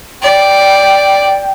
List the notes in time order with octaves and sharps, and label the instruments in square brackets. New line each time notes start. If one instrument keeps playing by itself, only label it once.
[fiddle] D5 [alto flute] G5